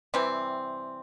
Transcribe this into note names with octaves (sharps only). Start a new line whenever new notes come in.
C3 E3 G3 C4